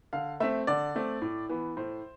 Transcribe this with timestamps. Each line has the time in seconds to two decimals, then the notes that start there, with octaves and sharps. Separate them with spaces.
0.13 D3 F5
0.40 A3 C4 E5
0.67 D3 D5
0.95 A3 C4
1.22 A2
1.49 E3 B3
1.77 A2 C5